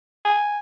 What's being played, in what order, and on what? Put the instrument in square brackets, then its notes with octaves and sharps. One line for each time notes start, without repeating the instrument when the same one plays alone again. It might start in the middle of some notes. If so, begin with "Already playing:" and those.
[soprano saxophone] G#5